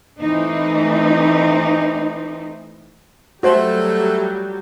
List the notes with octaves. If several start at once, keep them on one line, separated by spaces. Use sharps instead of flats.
E3 A3 C4 D#4
F#3 G3 A3 F#4 G4 C5